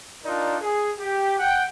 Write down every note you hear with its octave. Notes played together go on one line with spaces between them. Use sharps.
D4 D#4 F4 A#4 D5
G#4
G4
F#5 G5